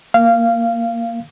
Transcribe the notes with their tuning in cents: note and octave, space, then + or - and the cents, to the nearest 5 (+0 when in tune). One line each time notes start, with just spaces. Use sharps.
A#3 +0 F5 -15